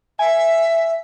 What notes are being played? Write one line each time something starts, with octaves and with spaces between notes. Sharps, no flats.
E5 G#5